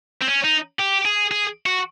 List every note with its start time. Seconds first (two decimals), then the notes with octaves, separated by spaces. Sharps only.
0.21 C4
0.27 C#4
0.44 D#4
0.79 G4
1.05 G#4
1.31 G#4
1.66 F#4